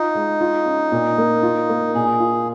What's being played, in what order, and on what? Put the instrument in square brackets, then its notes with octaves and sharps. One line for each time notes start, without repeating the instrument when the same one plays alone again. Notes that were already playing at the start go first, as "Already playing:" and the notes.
Already playing: [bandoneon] D#4 [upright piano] F4
[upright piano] G#3
F4
C#4
A#2
A#3
F4
A#3
[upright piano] A#2 [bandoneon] G#4
[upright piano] F4